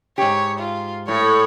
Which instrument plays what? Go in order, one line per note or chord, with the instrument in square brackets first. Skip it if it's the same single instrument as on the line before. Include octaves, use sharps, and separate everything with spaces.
[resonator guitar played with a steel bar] G#2 G4 [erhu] C#5
[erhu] F4
[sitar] A2 [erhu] C#5